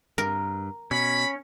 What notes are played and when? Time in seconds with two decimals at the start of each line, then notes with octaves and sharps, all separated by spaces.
0.18 G2 A#4
0.91 B2 C#4 B5